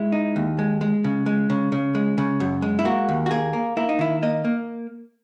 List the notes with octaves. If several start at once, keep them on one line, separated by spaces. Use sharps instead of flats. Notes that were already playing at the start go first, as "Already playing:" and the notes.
Already playing: G#3 E4
D#4
D#2
G#3
G#3
C#3
G#3
C#3
C#3
G#3
C#3
F#2
G#3
E4
A#3 F#4
D#2
F#4
A#3 G#4
A#3
A#3 E4
D#4
D#3 E4
A#3 D#5
A#3